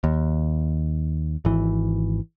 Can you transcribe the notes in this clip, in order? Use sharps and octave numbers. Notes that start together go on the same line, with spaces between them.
D#2
G#1 E3